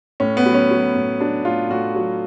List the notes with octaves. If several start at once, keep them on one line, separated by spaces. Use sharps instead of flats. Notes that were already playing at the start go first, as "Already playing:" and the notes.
A2 C#4
B3
F#3
C#4
F#3
A2
F#3 D4
A2 F4
A2 F#4
F#3